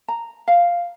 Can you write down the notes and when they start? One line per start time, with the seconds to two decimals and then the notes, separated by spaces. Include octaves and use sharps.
0.08 A#5
0.48 F5